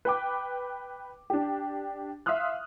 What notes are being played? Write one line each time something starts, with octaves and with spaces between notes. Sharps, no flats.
B4 G5 D6
D4 G4
E5 F5 C6 D#6 F6 F#6